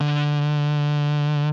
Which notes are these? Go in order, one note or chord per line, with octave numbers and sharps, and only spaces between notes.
D3